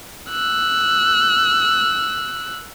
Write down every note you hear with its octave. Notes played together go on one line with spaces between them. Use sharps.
E6 F#6